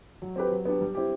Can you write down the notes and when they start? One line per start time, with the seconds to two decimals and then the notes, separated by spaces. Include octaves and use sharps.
0.22 F#3
0.36 C4 G4 B4
0.51 F#3
0.65 B3 D4 G4
0.81 G3
0.95 C4 E4 G4